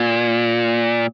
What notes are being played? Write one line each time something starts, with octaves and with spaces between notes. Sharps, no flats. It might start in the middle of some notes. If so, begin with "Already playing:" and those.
Already playing: A#2